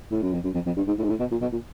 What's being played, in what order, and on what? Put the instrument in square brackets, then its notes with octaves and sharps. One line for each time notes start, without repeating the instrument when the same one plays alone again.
[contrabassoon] A2
F#2
F2
F#2
F2
F2
G2
G#2
A2
G#2
A2
B2
A#2
B2
A#2